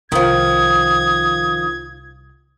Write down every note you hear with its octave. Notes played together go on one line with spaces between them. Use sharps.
C2 D#3 F3 D#6 G#6